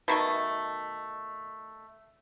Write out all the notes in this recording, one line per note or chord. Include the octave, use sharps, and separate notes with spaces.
B2 D#3 A3